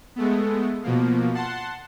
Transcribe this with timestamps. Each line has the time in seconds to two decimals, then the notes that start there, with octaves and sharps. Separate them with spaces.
0.16 G#3 A3 B3
0.83 B2 F3 A#3
1.34 F#5 A5 C6